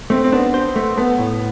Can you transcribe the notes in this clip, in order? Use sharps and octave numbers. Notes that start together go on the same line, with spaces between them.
A3 C4
C4
B3 D4
C5
A3
A3 B3
A2